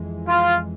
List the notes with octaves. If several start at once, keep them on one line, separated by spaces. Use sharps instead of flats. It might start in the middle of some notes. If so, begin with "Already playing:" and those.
Already playing: F2 E3 G#3
F4